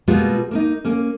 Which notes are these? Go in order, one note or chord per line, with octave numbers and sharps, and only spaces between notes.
B2 G3 G#3 A#3 B3 F4
A#3 C#4 D#4
A#3 C#4